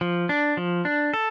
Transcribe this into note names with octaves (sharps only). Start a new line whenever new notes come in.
F3
D4
F3
D4
A4